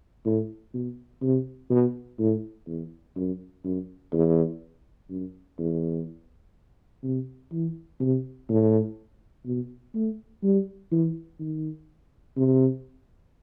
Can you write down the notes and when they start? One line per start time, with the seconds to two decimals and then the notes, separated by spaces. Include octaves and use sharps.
0.26 A2
0.74 B2
1.22 C3
1.70 B2
2.19 A2
2.67 E2
3.16 F#2
3.64 F#2
4.13 E2
5.10 F#2
5.59 E2
7.03 C3
7.52 E3
8.00 C3
8.50 A2
9.46 B2
9.95 A3
10.43 G3
10.92 E3
11.40 D#3
12.37 C3